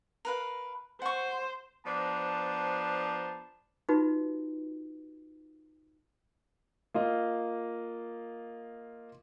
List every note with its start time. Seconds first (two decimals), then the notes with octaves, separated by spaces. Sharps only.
0.25 A#4 B4 F5
1.02 C5 F#5 C#6
1.86 F3 B3 D4 C5 A5 A#5
3.89 D#4 F4 F#4 B4
6.94 A#3 F4 D#5